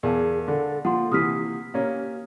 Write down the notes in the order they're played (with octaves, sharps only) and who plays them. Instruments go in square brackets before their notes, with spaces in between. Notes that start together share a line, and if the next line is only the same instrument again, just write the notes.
[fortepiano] E2 [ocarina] G#4 [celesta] A#4 F5 A5
[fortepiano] D3 [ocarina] A4
[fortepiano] F3 [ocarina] A#3 [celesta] F#5 C6
[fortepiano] C3 E3 [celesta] D#6 F6 B6
[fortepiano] A#3 C#4 [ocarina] G4